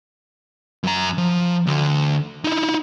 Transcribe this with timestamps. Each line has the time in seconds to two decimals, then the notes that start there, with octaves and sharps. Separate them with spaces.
0.83 F#2 A#5
1.18 F3
1.67 D2 D3
2.44 D#4 E4